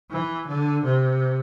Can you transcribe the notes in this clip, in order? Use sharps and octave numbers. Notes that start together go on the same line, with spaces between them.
E3
D3
C3